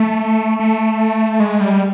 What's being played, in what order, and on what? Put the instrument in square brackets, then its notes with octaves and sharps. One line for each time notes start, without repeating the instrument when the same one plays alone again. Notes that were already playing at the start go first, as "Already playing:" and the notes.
Already playing: [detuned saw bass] A3
A3
G#3
G3